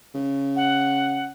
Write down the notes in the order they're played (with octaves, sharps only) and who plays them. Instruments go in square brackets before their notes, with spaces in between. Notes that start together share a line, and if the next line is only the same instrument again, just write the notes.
[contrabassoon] C#3
[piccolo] F#5